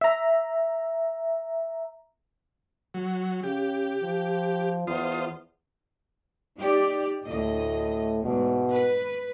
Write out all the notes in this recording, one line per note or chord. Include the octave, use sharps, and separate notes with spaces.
E5 A#5
F#3
C#3 G4
F3
E2 F4 C5 D#6
D#4 G4 D5
D2 A2 D#5
E2 G#2 B2
B4